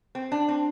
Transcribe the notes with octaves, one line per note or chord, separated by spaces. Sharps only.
C4
D4
C4